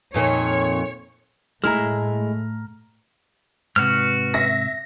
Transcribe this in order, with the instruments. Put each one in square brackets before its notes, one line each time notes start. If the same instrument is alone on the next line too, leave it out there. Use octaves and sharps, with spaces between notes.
[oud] F2 A#2 D#3 [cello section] C#5
[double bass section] A2 A3 [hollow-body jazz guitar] G#3 E4 [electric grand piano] A#5 F6
[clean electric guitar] G#2 C3 [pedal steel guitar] F#4 B4 F6
[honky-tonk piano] E5 A#6